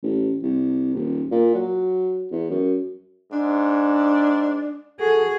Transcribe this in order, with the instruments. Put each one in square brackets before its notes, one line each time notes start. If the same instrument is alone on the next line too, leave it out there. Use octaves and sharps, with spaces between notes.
[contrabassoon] A1
C2
D#1
A#2
F#3
E2
F#2
[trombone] G#2 [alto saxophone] D4
[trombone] F#4 [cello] G#4 [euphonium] A4